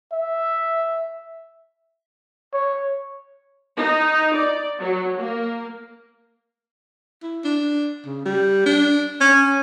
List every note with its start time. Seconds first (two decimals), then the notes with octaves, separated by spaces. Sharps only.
0.12 E5
2.53 C#5
3.77 D#4
4.36 D5
4.80 F#3
5.18 A#3
7.23 E4
7.44 D4
8.06 C#3
8.25 G3
8.66 D4
9.21 C#4